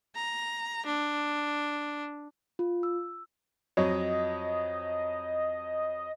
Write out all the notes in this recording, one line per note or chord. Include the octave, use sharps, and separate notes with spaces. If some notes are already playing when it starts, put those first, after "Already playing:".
A#5
D4
F4
E6
F2 F#3 C#5 D#5